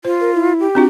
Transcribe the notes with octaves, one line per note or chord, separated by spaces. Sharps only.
F4 C5
A#4
E4
G4
C4 D4 F4 F#4